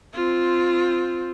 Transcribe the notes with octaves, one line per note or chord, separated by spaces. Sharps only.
C4 F4